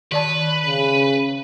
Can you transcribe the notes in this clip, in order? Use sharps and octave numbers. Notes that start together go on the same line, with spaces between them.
D#3 B4 D5 A5
C#3